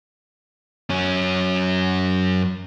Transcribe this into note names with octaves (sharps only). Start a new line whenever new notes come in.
F#2 C#4